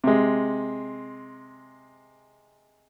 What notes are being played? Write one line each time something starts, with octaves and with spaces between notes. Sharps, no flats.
C3 G#3